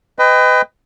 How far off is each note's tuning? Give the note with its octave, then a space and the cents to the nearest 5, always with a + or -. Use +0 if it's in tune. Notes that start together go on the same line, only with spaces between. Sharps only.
B4 +30 D#5 +0 G5 +25